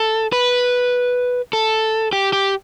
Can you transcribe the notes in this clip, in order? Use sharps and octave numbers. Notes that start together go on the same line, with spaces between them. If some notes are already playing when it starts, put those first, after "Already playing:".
Already playing: A4
B4
A4
G4
G4